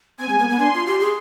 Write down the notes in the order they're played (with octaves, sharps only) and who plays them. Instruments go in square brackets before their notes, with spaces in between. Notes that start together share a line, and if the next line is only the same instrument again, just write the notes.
[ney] C4 [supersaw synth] G#5
[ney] G#3
B3
B3
[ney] D4 [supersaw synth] C6
[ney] F4
G4
G#4